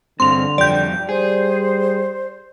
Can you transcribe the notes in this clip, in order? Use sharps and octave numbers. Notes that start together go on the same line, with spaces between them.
G2 D3 C4 C6 F7
F2 G3 D5 G5 G6
G3 G#4 C5